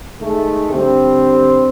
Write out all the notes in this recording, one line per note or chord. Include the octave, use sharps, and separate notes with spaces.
D#3 G#3 A3
D3 G3 C4